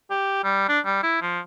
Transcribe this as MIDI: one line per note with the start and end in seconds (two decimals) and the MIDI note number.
0.11 0.40 67
0.44 0.67 55
0.69 0.79 62
0.86 1.00 55
1.03 1.19 64
1.22 1.40 53